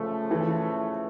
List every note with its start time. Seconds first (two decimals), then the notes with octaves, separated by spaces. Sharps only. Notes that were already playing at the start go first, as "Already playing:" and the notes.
Already playing: C#3 F3 A3
0.31 E3